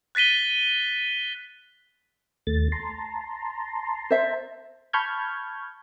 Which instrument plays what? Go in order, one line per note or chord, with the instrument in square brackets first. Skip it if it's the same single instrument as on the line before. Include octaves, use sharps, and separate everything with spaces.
[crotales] F#6 A6 B6 D#7 G7
[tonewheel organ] D#2 A3 A6
A5 A#5 C6
[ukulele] C5 E5
[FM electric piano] A5 B5 C#6 F6 G6 G#6